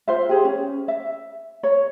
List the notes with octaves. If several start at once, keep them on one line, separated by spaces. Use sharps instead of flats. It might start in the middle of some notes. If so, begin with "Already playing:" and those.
F4 C5 E5
G4 G#4 C5
C#4
E5
C#5